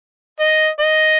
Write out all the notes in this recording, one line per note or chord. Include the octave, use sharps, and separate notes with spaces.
D#5
D#5